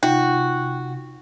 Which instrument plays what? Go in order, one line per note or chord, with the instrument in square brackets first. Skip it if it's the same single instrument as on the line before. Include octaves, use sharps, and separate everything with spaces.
[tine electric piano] C3 [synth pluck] D#4 F4 [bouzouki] F#4 [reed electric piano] G5